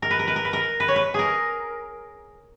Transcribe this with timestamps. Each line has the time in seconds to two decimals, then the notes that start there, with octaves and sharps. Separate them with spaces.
0.02 A#4
0.10 B4
0.19 A#4
0.28 B4
0.36 A#4
0.45 B4
0.53 A#4
0.80 B4
0.88 C#5
0.96 B4
1.14 G#4 A#4